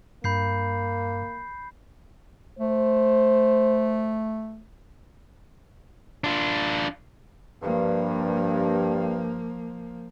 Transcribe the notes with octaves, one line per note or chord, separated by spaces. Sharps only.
G2 A#3 B5 G6 C7
A3 C5
D4 F4
G2 F3 A#3